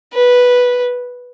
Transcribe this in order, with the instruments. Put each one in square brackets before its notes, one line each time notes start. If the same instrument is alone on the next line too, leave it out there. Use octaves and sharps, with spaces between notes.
[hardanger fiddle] B4